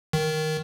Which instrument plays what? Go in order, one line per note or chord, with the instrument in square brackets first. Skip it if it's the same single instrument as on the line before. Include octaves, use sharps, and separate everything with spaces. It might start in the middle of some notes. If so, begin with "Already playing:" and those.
[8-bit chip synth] D#3